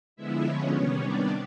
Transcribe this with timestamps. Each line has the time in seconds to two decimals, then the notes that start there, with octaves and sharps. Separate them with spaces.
0.16 D3 F3 G#3 B3 E4 E5
0.44 C#4 C#5
0.73 C3 D#3 G3 B3 C#4 C#5
1.01 D4 D5